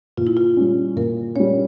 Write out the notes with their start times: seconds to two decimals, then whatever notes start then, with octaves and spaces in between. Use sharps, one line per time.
0.17 A#2 F4
0.27 E4
0.37 F4
0.57 G3 C#4
0.96 A#2 A#4
1.36 G3 C#4 C#5